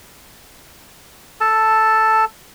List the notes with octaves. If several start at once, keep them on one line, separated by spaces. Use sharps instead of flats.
A4 A5